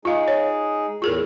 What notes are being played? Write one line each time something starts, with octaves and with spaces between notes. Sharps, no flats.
G#3 D#4 F4 G#4 F5
C#5
E2 A2 F4 G#4 A#4